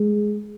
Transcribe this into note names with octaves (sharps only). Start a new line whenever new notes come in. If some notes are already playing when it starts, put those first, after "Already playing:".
Already playing: G#3